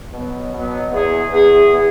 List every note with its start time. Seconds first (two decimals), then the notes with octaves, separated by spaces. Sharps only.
0.14 B2 F#3 B3
0.54 B2 F#3 B3
0.92 E2 E3 B3 G#4
1.32 E2 E3 B3 G#4
1.72 E3 B3 G#4